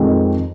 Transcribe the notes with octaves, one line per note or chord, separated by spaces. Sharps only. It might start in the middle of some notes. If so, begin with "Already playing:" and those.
Already playing: F2 D#3 G#3 C4